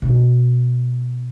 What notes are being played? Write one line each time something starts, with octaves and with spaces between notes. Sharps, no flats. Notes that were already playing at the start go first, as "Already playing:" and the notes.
B2 C4